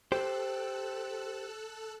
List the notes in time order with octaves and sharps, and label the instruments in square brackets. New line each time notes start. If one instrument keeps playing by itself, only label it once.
[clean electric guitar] G4 C5 [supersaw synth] A4 E6 F#6